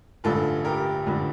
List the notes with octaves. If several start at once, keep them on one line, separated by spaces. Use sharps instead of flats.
A1 G2 D3 F3 F4 A4
G4 A#4
A1 G2 D3 F3